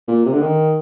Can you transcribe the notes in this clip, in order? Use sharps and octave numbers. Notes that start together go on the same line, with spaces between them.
A#2
C3
D3
D#3